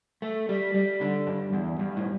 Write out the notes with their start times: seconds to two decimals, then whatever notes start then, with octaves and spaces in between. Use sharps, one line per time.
0.22 A3
0.49 G3
0.74 G3
1.01 D3
1.27 G2
1.53 E2
1.79 G2
1.96 A2